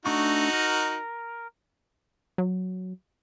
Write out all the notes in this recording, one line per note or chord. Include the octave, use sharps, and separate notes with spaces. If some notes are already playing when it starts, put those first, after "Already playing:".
A3 D4 D#4 F#4 C#6
A#4
F#3